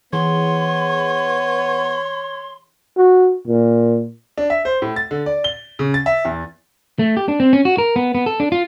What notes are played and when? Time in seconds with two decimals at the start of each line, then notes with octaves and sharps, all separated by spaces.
0.13 E3 B3 G#4 C#5 C6
2.97 F#4
3.48 A#2
4.38 D4
4.50 E5
4.65 C5
4.82 A2
4.96 A6
5.11 D3
5.26 D5
5.44 G7
5.79 C#3
5.94 A6
6.06 E5
6.25 E2
6.99 A3
7.17 G4
7.28 D4
7.40 C4
7.53 C#4
7.65 F#4
7.78 A#4
7.96 B3
8.15 B3
8.26 A4
8.40 D4
8.52 F4